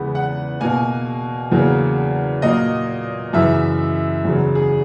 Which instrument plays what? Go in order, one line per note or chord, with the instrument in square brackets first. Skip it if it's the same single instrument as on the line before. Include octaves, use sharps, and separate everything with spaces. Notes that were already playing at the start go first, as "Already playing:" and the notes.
Already playing: [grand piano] E2 C#3 G#3 B3
F#5
B2 A#3 G#5
E2 C#3 F#3 A#3
A#2 F#3 A#3 D#5
F#2 C#3 E3 E5
E2 C#3 F#3
G#4